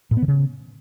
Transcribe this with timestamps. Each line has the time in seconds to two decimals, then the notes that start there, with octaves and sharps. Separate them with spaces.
0.11 A2
0.17 B3
0.22 D3
0.28 C#3